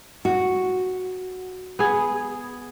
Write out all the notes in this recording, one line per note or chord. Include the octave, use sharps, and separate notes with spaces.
F#4
B3 G#4